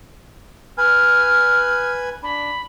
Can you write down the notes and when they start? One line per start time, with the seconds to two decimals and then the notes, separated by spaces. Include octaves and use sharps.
0.78 B4 G#5 F6
2.23 D4 B5